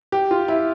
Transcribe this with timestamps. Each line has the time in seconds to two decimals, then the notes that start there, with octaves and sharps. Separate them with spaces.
0.12 G4
0.31 F4
0.48 E4